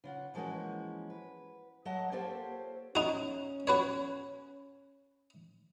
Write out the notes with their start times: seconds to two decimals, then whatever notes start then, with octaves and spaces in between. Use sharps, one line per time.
0.04 C#3 F4 F#5
0.34 E3 F3 G#3 A#3 C#4 F#4
1.10 B4
1.85 F#3 A3 D#5 F#5 A5
2.12 A#3 F4 G4 A4 C5 C#5
2.95 C#4 D#4 F#4
3.67 F#4 B4 C#5